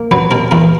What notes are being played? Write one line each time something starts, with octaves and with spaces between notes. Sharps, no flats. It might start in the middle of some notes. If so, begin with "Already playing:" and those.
Already playing: A#3
F#3 B4
B2 A#4
E2 A#4